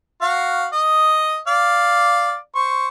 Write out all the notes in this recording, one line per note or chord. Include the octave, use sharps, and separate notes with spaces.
F#4 F5
D#5
D5 F5
C5 C#6